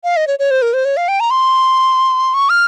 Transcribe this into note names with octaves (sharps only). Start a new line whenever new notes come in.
F5
D#5
C#5
C#5
C5
A#4
C5
C#5
F5
G5
A#5
C6
C#6
F6